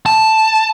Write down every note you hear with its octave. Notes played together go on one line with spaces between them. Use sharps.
A5